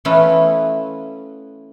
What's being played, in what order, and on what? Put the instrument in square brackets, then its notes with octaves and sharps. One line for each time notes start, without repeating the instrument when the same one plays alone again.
[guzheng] E3 A3 B3 C#4 E4 F4